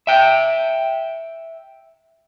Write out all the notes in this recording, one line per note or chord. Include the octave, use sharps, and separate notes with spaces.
E5 G5